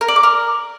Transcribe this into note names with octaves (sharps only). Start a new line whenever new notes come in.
A#4
D5
D6
A#4